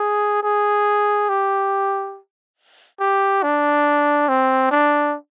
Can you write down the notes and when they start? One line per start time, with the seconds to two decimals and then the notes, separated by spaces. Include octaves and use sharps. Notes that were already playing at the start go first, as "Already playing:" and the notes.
Already playing: G#4
0.43 G#4
1.29 G4
3.00 G4
3.43 D4
4.29 C4
4.71 D4